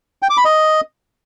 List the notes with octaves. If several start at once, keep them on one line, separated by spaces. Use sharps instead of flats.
G5
D6
B5
D#5